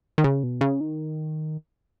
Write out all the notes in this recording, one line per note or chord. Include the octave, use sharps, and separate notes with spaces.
D#3
C#3
B2
C#3
D#3